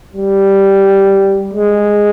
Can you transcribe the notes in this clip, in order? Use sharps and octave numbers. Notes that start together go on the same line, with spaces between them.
G3
G#3